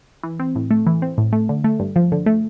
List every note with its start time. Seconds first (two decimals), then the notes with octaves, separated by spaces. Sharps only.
0.23 E3
0.39 C4
0.56 A2
0.71 A3
0.87 E3
1.02 C4
1.18 A2
1.33 A3
1.49 D3
1.64 A3
1.79 G2
1.96 F3
2.12 D3
2.26 A3